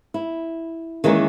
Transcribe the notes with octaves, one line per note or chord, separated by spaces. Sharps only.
E4
D#3 E3 G#3 A#3 C#4